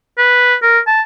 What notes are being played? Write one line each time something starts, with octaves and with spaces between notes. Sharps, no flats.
B4
A#4
A5